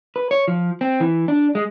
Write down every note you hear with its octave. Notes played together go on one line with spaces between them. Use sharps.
B4
C#5
F3
C4
E3
D4
G#3